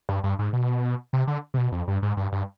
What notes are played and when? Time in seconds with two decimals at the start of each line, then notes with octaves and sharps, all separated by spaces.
0.09 G2
0.24 G2
0.39 G#2
0.53 B2
1.13 C3
1.27 D3
1.54 C3
1.57 B2
1.72 F2
1.88 G2
2.02 G#2
2.17 G2
2.32 G2